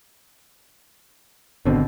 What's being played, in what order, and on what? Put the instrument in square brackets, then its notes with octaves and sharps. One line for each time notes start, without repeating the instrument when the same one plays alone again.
[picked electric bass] G#1 D3 [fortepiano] B2 C4